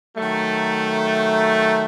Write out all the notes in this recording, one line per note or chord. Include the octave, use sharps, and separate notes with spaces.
D#3 F#3 A3